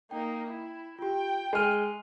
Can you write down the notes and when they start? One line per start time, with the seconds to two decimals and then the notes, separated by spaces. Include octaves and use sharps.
0.11 A#3 D#4 G5
0.47 E4
0.99 F4 G4 G5
1.53 G#3 G#5 F6 D#7